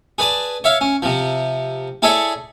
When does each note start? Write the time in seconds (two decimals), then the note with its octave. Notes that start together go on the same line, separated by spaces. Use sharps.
0.18 G#4 B4 D5 A5
0.64 C#5 E5 F5
0.81 C#4
1.02 C3 F3
2.02 E4 G#4 A4 C#5 D5 E5